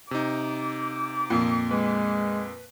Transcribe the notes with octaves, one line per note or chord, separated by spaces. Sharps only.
C3 D#4 D6
F2 A#2
G#3 B4